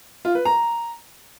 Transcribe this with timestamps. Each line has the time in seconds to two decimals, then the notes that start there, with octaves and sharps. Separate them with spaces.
0.25 F4
0.35 B4
0.45 A#5